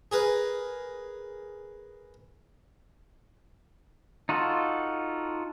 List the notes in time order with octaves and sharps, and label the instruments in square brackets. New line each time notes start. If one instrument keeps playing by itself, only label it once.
[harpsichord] G#4 A#4 B4
[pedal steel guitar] D#4 F4 F#4 A4